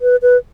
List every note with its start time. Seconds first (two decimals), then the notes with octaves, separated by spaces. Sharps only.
0.02 B4
0.22 B4